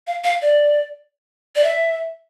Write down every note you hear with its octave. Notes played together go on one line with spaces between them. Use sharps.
F5
F5
D5
D5
E5